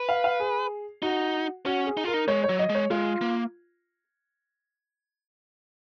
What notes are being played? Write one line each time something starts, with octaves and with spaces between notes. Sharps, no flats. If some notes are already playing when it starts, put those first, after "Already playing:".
Already playing: B4
F5
F5
G#4
D#4 F#4
C#4 F#4
G#4
D#4
F4 A#4
D#4
G#3 C#5
C#5
F#3
D#5
G#3
C#5
G#3 F4
A#3